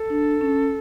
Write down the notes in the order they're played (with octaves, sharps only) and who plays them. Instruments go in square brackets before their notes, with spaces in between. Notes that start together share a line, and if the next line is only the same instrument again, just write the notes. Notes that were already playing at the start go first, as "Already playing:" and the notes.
Already playing: [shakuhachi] A4
[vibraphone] D4
C#4